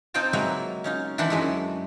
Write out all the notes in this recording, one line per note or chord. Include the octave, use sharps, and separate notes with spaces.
C4 D#4 F4 C5 G5 A5
F#3 G#3 A#3 B4 E5
C#4 D#4 F4
D#3 E3 D4 E4 F#5 C6
F#2 G#3 A3